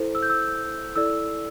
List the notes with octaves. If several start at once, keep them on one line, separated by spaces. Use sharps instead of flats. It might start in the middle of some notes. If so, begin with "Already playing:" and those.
Already playing: E4 A4 C5
E6
G6
E6
E4 A4 D5 E6